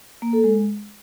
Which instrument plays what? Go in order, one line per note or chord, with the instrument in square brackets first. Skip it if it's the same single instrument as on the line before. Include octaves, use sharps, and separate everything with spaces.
[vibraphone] A#3
A4
G#3